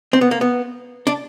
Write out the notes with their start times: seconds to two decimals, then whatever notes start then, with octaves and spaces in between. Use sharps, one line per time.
0.13 C4
0.21 B3
0.31 A#3
0.41 B3
1.07 D4